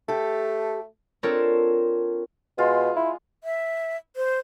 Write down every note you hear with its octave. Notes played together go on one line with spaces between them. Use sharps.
A3 G4 A4
C4 D4 F4 A4 A#4 C#5
B2 G#3 F4
E4
E5
C5